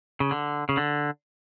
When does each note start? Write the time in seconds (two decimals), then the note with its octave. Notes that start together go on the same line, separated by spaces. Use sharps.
0.20 C#3
0.31 D3
0.69 C#3
0.77 D3